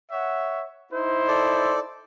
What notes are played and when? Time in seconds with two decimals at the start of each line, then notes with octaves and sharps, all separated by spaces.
0.11 C#5 E5 F#5
0.92 D#4 E4 C5
1.28 A4 D5